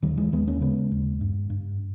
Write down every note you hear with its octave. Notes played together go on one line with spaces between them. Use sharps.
D#2 D#3 G3
E3 G#3
D#2 G#3 B3
A#3 C#4
C#3 G#3 B3
D#2
G2
G2